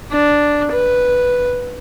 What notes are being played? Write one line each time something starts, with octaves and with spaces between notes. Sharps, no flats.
D4
B4